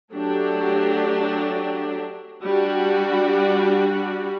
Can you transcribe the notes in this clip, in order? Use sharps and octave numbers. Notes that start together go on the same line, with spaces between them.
F#3 A3 D4 G4
G3 D4 F#4